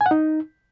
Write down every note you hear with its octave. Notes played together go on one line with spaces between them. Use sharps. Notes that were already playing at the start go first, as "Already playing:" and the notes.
G#5
F#5
D#4